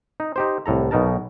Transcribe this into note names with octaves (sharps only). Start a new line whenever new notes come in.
D#4
D#4 G4 C5
C2 A2 A4 A#5
B1 B2 D#4 A#4 A5